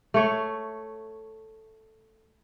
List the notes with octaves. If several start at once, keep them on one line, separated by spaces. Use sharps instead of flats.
A3 C#5